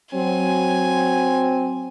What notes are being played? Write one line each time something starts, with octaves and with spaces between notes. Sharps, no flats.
F#3 C4 G#5